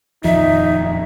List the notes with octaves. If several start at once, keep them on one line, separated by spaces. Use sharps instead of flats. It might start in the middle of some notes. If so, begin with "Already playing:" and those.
D#1 F2 D#3 F3 D#4 E5